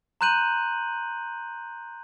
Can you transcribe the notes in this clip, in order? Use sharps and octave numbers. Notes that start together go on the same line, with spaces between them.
A#5 C6 F#6 G6 D#7 F#7